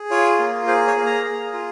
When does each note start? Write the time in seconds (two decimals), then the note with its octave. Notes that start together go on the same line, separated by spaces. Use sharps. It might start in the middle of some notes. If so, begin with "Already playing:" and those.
Already playing: G#4
0.11 F4 C#5
0.39 A#3
0.67 G#4 C5
0.87 C#5
0.96 A#3
1.06 A#5
1.25 G#4
1.53 F4